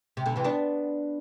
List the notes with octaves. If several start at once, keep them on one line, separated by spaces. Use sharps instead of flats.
C3
B2 D3
C3 E3
B3 D4